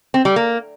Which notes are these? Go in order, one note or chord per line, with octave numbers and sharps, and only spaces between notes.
C4
G3
A#3